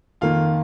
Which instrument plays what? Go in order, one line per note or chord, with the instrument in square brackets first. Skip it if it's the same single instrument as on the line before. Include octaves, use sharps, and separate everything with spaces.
[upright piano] F2 D#3 A#3 [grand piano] F4 F5